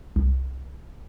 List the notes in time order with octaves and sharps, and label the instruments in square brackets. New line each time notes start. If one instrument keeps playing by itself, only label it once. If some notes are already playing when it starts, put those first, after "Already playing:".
[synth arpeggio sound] C2